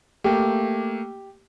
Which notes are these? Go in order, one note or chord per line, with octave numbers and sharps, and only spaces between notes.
A3 A#3 G4